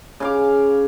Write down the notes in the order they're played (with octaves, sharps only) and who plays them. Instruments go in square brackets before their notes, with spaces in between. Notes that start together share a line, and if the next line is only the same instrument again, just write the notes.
[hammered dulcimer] C#3 F5 D6